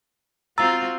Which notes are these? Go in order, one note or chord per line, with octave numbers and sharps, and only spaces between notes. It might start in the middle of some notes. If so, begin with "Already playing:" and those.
C4 F4 F#4 A#5 E6 A6